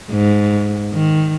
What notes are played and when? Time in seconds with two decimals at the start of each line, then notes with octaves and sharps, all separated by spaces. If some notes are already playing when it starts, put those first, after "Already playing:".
0.12 G#2
0.93 D#3